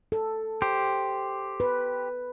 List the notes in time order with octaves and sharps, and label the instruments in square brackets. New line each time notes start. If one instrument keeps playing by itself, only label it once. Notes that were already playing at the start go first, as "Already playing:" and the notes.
[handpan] A4
[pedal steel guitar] G4 C5
[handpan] B4